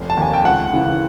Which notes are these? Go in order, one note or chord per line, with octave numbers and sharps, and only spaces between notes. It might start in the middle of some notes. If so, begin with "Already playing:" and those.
Already playing: F1
A5
D#2 D#3 G#5
G5
C#2 F#5
C#3 E3